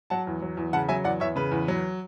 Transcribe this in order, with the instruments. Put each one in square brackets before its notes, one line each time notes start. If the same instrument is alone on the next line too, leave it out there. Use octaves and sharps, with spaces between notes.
[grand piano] F#3 F#5 A5
E2
F#3
E2
C#3 F#5 A5
F#3 E5 G#5
E2 D5 F#5
E2 C#5 E5
C#3 B4
E2
F#3